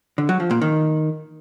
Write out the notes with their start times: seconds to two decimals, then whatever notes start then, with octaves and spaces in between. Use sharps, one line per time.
0.18 D3
0.29 F#3
0.40 F3
0.51 A#2
0.62 D#3